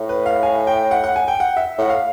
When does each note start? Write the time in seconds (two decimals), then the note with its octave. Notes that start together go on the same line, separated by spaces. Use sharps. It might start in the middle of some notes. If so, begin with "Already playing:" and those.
Already playing: A2
0.09 B4
0.26 F5
0.43 G#5
0.67 G5
0.91 F#5
1.04 F#5
1.16 G#5
1.28 G5
1.40 F#5
1.57 E5
1.78 A2 F#5
1.89 F5